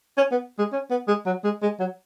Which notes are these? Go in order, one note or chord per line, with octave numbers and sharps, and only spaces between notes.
C#4
B3
G#3
C#4
B3
G#3
F#3
G#3
G#3
F#3